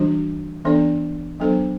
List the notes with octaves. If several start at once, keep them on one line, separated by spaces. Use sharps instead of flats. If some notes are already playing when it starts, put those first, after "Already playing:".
Already playing: E3 G3 D4 F#4
E3 B3 D4 A4 D5
F#3 B3 D4 A4 C5